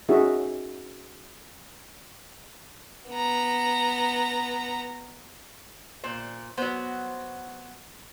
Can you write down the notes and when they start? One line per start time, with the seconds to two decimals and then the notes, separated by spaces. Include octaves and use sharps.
0.09 C#4 D#4 F#4 G#4 E5
3.10 B3 A#5
6.04 A#2 C5
6.57 F#3 B3 C5